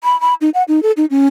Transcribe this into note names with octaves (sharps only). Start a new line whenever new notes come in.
B5
B5
D#4
F#5
D#4
A4
D#4
C#4